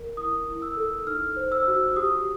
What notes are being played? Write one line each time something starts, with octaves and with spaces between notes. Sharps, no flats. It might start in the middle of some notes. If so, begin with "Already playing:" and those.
Already playing: A#4
E4 D#6
E4
E6
A4
D#4 F6
C5
E6
F#4
G4 D#6